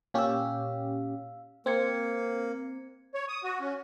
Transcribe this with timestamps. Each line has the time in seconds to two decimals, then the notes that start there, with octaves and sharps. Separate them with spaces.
0.14 A#2 C#4 G4 F5 E6
1.66 A#3 C4 C5 G#6 C#7
3.14 C#5
3.28 D#6
3.44 F#4
3.60 C#4